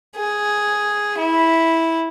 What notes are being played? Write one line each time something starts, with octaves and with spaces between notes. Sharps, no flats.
G#4
E4